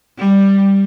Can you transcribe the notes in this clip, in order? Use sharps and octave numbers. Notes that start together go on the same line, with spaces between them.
G3